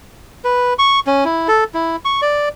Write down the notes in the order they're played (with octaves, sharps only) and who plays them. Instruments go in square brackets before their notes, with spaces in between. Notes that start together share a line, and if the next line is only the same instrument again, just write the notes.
[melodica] B4
C#6
C#4
E4
A4
E4
C#6
D5